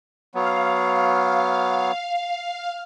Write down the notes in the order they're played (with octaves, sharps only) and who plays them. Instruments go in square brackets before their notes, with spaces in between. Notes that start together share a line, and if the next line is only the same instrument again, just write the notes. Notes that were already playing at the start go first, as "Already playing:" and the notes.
[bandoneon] F#3 B3 [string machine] F5